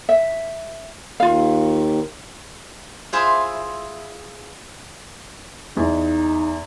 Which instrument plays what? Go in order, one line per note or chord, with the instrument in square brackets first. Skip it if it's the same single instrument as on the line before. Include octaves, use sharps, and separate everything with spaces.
[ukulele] E5
[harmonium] D#2 D#3 [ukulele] F4 F5
[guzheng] E4 F4 G#4 C5 E5
[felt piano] E2 [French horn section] D#4